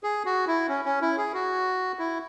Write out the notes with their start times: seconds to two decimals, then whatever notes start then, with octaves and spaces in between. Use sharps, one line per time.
0.03 G#4
0.26 F#4
0.47 E4
0.68 C#4
0.85 C#4
1.01 E4
1.18 G#4
1.34 F#4
1.99 E4